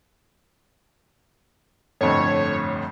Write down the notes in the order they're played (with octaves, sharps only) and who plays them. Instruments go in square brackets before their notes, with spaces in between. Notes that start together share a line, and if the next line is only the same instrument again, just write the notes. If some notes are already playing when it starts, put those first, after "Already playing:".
[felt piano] G1 F2 A2 [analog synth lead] C#5